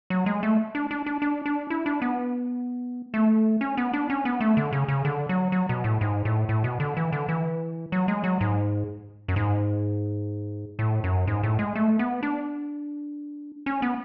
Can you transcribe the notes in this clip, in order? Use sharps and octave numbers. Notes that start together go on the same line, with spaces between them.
F#3
G#3
A3
D4
D4
D4
D4
D4
E4
D4
B3
A3
C#4
B3
D4
C#4
B3
A3
D3
C#3
C#3
D3
F#3
F#3
B2
A2
G#2
A2
A2
B2
D3
E3
D3
E3
F#3
G#3
F#3
G#2
F#2
G#2
A2
F#2
G#2
A2
G#3
A3
B3
D4
C#4
B3